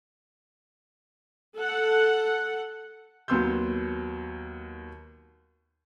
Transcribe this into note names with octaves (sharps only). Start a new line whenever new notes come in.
A4 F#5
D#2 F#3 B3 C6 E6 G6